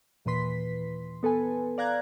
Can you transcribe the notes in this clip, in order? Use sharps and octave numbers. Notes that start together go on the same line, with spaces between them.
D#2 A#2 E3 B4 C6 B6
B3 A4 B4 G#5
D5 F5 A#5 F#6 G#6